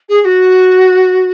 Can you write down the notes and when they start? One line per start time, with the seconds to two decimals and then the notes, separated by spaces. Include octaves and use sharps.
0.08 G#4
0.20 G#4
0.24 F#4